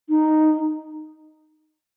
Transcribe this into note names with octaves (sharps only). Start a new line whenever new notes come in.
D#4